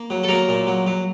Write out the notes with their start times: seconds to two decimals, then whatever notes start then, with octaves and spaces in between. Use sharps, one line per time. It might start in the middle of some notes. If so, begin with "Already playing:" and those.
Already playing: A#3
0.10 F#3
0.24 A4
0.28 F#3 A#3 A#4
0.49 A#2
0.67 F#3
0.87 F#3